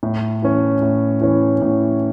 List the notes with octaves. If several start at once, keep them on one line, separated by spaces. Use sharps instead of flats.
A2
E3 C#4
A2
E3 C#4
A2